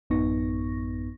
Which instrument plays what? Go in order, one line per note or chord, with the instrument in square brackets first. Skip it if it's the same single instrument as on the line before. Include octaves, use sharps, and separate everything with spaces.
[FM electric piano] A1 F#2 B3 D#4 C#6 A#6